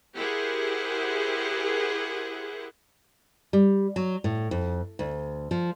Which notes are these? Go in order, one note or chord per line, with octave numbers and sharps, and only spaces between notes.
E4 G4 G#4 A#4 C5 F#5
G3
F#3
A2
F2
D2
F3